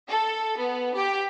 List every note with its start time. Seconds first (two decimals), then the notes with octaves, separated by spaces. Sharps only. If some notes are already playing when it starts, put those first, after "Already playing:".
0.10 A4
0.59 B3
0.95 G4